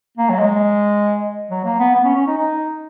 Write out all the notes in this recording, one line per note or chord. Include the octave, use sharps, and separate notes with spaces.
A#3
F#3
G#3
F#3
A#3
B3
B3
C#4
C#4
D#4
D#4